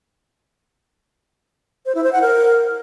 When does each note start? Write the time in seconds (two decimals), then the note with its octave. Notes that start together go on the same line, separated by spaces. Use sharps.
1.86 C5
1.95 E4
2.04 C5
2.13 F#5
2.22 A#4